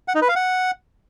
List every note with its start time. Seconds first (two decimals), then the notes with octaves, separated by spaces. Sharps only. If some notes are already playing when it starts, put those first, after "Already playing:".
0.08 F#5
0.15 D#4
0.22 B4
0.29 F5
0.36 F#5